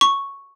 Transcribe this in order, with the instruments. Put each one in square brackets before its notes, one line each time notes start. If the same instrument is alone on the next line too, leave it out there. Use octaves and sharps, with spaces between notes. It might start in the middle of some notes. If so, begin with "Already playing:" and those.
[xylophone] C#6